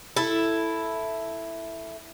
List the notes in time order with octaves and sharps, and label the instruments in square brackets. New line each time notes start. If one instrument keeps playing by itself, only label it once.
[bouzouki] E4 A4